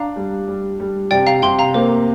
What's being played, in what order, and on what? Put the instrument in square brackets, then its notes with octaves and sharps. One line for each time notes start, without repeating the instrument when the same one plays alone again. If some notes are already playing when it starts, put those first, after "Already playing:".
Already playing: [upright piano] D4 [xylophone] F5 A#5
[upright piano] G3
G3
G3
[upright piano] C3 [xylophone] D5 G5
[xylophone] F5 A#5
[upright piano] C3 [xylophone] G5 C6
[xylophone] F5 A#5
[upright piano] A#3 [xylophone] C5